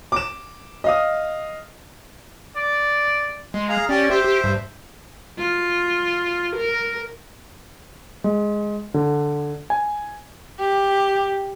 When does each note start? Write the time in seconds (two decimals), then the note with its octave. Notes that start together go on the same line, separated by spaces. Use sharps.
0.12 D6 E7
0.84 D#5 F5 D#6
2.56 D5
3.54 G#3 C6
3.69 G#4 F5 A#5
3.89 C#4 G4 D5
4.10 G4 C5 E5
4.24 G4
4.44 G2
5.39 F4
6.56 A#4
8.24 G#3
8.94 D3
9.70 G#5
10.59 G4